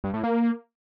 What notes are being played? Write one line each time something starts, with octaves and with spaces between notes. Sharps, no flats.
G2
A2
A#3